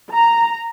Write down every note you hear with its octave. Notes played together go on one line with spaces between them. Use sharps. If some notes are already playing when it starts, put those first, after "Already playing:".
A#5